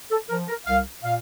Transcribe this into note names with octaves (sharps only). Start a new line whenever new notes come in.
A4
F3 A#4
A#4
C2 F5
A#2 F5